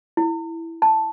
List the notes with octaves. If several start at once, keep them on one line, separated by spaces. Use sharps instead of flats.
E4
A5